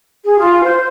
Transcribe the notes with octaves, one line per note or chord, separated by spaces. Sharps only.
G#4
F4
C5